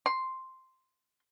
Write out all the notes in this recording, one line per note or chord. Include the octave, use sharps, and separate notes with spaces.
C6